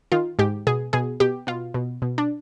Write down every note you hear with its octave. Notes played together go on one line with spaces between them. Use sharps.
D#3 F4
G#2 G4
B2 G#4
B2 G#4
B2 G4
B2 F4
B2
B2
D4